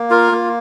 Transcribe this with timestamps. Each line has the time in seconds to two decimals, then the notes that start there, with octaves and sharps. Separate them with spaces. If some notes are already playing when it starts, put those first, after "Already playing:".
Already playing: A#3
0.10 F4 A#4
0.32 A#3